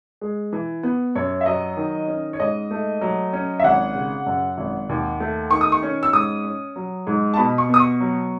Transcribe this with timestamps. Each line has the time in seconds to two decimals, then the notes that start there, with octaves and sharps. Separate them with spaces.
0.21 G#3
0.53 E3
0.83 B3
1.15 F#2 C#5
1.41 E5
1.46 F#3 D#5
1.77 D#3
2.08 C#4
2.33 C#5
2.40 G#2 D#5
2.71 A3
3.01 F#3
3.33 C#4
3.60 E5
3.64 G#1 F#5
3.95 C#3
4.26 F#2
4.58 G#1
4.89 D#2
5.20 A3
5.51 D#3 C#6
5.61 D#6
5.72 C#6
5.83 C#4
6.03 E6
6.13 G#2 D#6
6.44 C#4
6.76 F#3
7.07 G#2
7.34 A5
7.37 B2 B5
7.58 C#6
7.69 B3
7.74 D#6
7.80 C#6
8.00 F#3